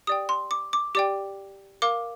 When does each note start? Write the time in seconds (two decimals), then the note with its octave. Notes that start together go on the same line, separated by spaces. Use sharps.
0.07 G4 D5 G5 D#6
0.29 C6
0.51 D6
0.73 D6
0.95 G4 D5 G5 D6
1.82 A#4 F5 D6